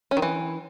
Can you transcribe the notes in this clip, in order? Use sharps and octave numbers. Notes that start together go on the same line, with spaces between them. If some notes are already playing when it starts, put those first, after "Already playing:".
C#4
D#3
E3